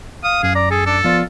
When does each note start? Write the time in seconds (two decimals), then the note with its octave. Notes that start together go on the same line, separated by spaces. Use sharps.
0.24 F5 D#6
0.43 F#2 G#4
0.55 D5 A#5
0.71 G#4 A4
0.86 D4 A4
1.04 F3 B3 F4 D5